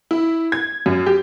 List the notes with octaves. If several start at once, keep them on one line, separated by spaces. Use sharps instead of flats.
E4
G#6
F#2
G4